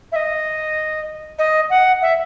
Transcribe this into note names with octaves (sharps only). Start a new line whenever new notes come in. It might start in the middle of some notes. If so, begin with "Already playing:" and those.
E5
D#5
D#5
F#5
E5